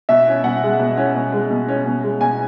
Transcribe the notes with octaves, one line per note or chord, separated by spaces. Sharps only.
B2 E5
C#4
B2 F#5
G#3
B2
C#4
B2
G#3
B2
C#4
B2
G#3
B2 G#5